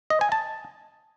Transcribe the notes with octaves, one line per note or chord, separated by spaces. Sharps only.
D#5
G#5
A5